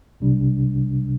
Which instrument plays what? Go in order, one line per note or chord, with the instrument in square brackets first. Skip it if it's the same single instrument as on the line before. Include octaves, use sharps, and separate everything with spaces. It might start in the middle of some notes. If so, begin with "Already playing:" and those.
[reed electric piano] C2 C3 G3 D4